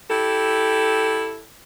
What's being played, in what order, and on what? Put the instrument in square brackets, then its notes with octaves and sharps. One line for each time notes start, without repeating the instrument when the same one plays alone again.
[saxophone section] E4 G4 A4